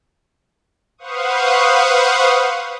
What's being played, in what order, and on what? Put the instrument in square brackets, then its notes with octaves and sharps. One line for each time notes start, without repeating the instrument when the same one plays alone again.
[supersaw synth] B4 C5 F5 F#5 C#6 D#6